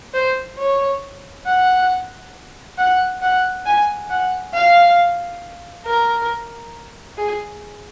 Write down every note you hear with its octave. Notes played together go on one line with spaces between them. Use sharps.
C5
C#5
F#5
F#5
F#5
G#5
F#5
F5
A#4
G#4